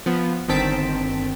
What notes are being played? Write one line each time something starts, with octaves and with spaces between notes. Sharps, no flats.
F3 B3
G1 D#3 C4 A5 B6 D7